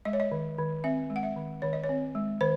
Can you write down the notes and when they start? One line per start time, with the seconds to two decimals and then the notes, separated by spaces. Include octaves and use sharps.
0.05 G#3 D#5
0.13 C#5
0.20 D#5
0.32 D#3
0.58 D#3
0.84 C4 E5
1.10 G#3
1.16 F#5
1.23 E5
1.36 D#3
1.62 D#3 C#5
1.73 D#5
1.84 C#5
1.89 C4
2.15 G#3
2.41 D#3 C5